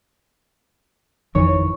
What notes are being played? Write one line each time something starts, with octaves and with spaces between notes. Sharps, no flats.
G#1 F2 D#3 E3 C#5